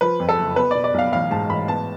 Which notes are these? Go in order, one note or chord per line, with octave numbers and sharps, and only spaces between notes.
F3 B4
F2
A4
F#1
B3 B4
D5
B2
D5
B1 F5
A1 F5
G#2 A5
A1 B5
B3 A5